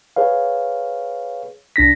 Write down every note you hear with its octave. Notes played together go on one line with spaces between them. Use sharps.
G#4 B4 C#5 F5
C2 D4 A#6 B6